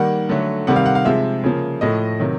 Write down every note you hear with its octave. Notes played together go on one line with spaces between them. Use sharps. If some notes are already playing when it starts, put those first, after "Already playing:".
Already playing: D#3 G3 A#3 F#5
D3 F#3 A3
C3 D#3 G3 F#5
F5
F#5
F5
C3 F3 G#3 E5
C#3 F3 A#3
A2 F3 A3 D#5
C3 D#3 F#3